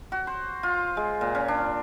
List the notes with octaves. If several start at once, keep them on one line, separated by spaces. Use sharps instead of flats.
F#4
C5
F4
G#3
A#2
C#4
D4